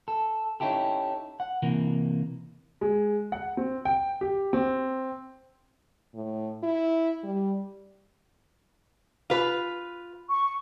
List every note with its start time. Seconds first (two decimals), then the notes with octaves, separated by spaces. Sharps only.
0.08 A4
0.60 C#4 D#4 E4 G4 A4
1.40 F#5
1.62 C3 E3 A#3
2.81 G#3
3.32 F#5
3.57 C4
3.85 G5
4.21 G4
4.53 C4
6.15 A2
6.63 E4
7.23 G3
9.30 F4 B4
10.30 C#6